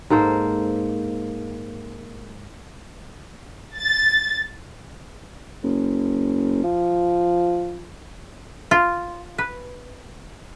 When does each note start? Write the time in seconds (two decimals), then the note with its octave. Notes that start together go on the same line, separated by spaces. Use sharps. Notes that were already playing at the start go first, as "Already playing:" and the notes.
0.10 G#2 A#3 A4 C5
3.78 A6
5.63 F#1
6.64 F3
8.71 F4
9.38 B4